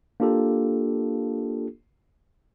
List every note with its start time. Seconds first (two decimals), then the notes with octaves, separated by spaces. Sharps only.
0.20 A#3 D4 F4 G4 A4